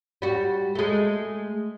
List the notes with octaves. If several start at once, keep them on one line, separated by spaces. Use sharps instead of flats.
G3 F#4
G#3 A3